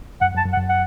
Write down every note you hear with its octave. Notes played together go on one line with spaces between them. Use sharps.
F#2 F#5
F#2
A5
F#2
F#5
F#2
F#5